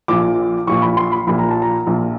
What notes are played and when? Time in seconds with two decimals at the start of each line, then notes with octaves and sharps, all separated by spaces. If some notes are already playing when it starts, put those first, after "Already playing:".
0.08 A#1 A#2 F3 D6
0.67 A#1 A#2 F3 C#6
0.82 B5
0.97 C6
1.12 B5
1.27 A#1 A#2 F3 B5
1.39 A#5
1.50 A5
1.62 A#5
1.87 A#1 A#2 F3